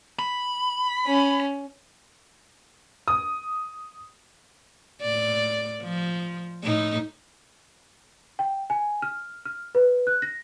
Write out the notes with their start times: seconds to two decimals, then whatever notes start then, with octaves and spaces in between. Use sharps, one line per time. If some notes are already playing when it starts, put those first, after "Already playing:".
0.19 B5
1.07 C#4
3.08 D#6
5.02 A2 D5
5.83 F3
6.64 A2 D#4
8.39 G5
8.70 G#5
9.02 F6
9.45 F6
9.75 B4
10.07 F#6
10.22 A#6